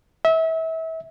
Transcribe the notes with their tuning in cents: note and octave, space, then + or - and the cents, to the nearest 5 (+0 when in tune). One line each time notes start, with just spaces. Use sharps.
E5 -30